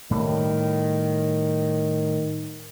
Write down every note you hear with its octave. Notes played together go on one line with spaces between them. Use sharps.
A2 D#3 G3